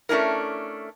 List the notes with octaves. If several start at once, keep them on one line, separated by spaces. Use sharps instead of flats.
A3 C#4 D4 E4 A#4